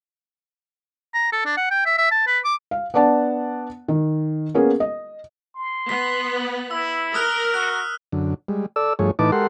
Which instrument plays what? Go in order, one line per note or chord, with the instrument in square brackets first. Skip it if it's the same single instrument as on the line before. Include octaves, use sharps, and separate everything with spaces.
[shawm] A#5
A4
D4
F#5
G5
E5
E5
A5
B4
D6
[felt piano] F5
B3 D4 D5 F#5 A5
D#3
A#3 B3 C#4 G#4 A#4
D#5
[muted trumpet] C6
[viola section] B3 [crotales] B6
[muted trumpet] E4 [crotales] E6
[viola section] A#4 [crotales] D#6 F6 F#6
[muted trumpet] F#4 [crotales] F#6
[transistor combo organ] F#2 D3
G3 G#3
A4 D5 E6
G2 F3 A3 G#4 C#5
A2 E3 D#4 B4 A5 D6
G#3 G4 A4 A#4 F#5 C6